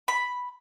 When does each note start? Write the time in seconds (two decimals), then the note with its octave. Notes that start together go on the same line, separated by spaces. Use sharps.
0.08 B5